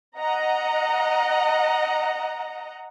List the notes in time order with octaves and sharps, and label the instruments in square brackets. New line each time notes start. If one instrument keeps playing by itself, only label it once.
[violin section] D#5 F#5 A#5